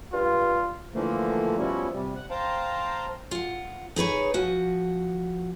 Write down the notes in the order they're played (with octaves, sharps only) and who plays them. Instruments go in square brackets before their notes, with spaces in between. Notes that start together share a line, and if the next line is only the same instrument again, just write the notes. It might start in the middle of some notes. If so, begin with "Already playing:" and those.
[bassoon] G2 [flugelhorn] F4
[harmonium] D3 E3 F3 A3 A#3
F3 G3 B3 C#4 E4 F#4
C3 G3
F#5
C5 F5 G5 A5 A#5
[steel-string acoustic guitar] F4 F#5
D#4 G#4 B4 C#5
F3 F#4